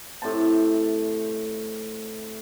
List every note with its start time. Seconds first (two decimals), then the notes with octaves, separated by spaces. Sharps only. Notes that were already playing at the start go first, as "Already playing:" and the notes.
0.22 A2 C3 C5 A5